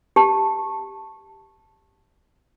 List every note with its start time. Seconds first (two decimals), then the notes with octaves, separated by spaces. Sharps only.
0.16 G4 A5